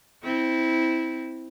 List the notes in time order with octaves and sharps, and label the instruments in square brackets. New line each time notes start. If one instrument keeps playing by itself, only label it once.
[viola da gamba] C4 E4